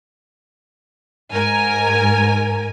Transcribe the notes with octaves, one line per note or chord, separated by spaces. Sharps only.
G#2 A#4 G#5